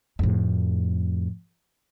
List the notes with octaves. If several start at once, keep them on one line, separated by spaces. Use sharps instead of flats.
F2 A2